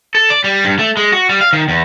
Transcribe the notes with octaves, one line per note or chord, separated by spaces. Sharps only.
A4
D5
G3
G2
A3
G#3
F#4
G3
F5
D#3
E2